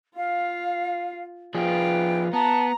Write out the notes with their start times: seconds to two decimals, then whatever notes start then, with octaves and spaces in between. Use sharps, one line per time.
0.16 F4 F5
1.54 F3 F4 G#4 B4 G5
2.33 B3 A5 A#5